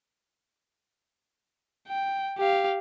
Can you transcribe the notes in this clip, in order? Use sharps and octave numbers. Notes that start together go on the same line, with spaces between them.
G5
G4 F5